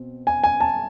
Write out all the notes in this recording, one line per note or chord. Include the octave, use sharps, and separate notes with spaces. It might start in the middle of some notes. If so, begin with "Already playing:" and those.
Already playing: B2 C4
G#5
G#5
A5